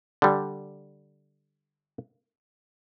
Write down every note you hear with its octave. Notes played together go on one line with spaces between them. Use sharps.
D3 G3